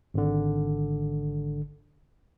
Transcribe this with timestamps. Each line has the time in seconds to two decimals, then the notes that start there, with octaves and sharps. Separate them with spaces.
0.14 G#1 D3